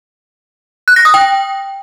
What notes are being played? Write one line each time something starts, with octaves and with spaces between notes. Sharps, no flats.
F#6
A#6
D#6
G5